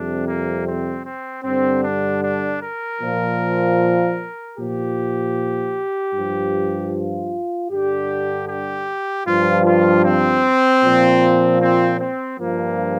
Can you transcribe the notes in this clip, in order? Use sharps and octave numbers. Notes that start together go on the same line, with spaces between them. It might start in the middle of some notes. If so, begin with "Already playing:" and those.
Already playing: F2 C3 G3 D4
A#3
C4
C4
G2 D3 G3 C4
D4
D4
A#4
A#2 F3
A#2 F3 G4
G2 F3
F4
G2 D3 G3 G4
G4
G2 F3 F4
F4
C4
A#2 F3
C4
C4
G2 F3 A#3